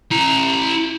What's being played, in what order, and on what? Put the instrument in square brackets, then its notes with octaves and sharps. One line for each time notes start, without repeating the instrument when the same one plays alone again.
[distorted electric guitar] E4 A#5